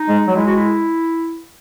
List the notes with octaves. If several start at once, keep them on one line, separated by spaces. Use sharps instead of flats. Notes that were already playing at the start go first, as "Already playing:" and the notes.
Already playing: D#4
G#3
F#3
G#3 E4
F#4
E4